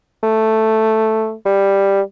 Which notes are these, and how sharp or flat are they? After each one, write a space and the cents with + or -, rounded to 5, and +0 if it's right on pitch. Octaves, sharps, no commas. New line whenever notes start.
A3 +0
G3 +5